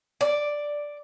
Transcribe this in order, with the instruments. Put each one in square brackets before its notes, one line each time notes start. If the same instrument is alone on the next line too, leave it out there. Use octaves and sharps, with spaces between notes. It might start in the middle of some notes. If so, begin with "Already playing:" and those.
[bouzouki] D5